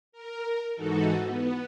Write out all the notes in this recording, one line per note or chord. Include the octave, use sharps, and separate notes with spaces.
A#4
G#2 E3 D#4 F#4 A4
B3